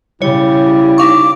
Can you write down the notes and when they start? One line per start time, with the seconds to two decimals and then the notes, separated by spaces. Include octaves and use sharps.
0.22 C#3 G3 E4 C#5
0.98 D#4 F5 C#6 D6